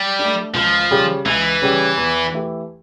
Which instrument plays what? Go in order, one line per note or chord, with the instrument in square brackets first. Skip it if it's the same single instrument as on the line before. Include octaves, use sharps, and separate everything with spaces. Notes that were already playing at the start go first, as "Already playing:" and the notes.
Already playing: [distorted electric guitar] G3
[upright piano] A3 D4
[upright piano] C#2 [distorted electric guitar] F3
[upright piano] C#3 G3 C#4 G4
[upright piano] C#2 [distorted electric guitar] E3
[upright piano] C#3 G3 C#4 G4
E2
E3 A3 E4 G4